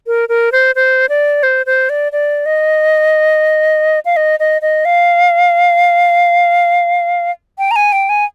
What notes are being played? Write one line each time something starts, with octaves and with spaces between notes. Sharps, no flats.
A#4
A#4
C5
C5
D5
C5
C5
D5
D5
D#5
F5
D#5
D#5
D#5
F5
G5
A#5
G#5
G5
G#5